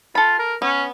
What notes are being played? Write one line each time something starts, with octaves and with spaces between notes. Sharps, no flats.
F4 A4 B5
A#4
B3 C#4